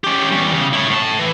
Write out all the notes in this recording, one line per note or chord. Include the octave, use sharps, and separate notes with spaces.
C#4 G4
E2 G3
C#3
E4 C#5
A2 A5
E3